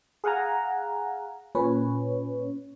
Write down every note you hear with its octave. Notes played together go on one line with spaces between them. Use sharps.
G#4 F5 F#5 G#5 A#5
A#2 C#4 B4 C#5